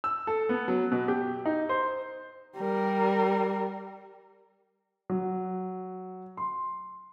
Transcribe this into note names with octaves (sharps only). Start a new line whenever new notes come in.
E6
A4
B3
F#3
B2
G4
D#4
C5
G3 A#4
F#3
C6